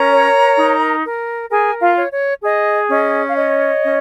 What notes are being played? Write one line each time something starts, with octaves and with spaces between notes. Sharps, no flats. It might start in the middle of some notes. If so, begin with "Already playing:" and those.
Already playing: C#4 A#4 A#5
C#5
D#4
A#4
G#4 A#4 G#5
F4 F5
C#5
C#5
G#4 D#5
C#4 D#5
F5
C#5 D#5
C#4